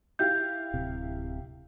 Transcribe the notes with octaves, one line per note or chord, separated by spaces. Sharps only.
E4 G4 F5 G6
D1 C3